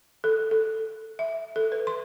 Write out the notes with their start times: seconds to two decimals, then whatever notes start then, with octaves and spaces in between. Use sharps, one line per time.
0.24 A4
0.51 A4
1.19 E5
1.56 A4
1.72 B4
1.87 C6